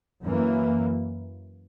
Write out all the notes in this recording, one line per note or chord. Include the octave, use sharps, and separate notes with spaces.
F#2 E3 A#3